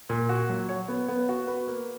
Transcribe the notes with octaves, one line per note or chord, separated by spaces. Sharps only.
A#2
F#4
F#3
C#5
B3
B3
F#4
B4
A#3